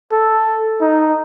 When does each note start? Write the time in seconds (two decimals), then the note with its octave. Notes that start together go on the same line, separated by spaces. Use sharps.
0.12 A4
0.81 D#4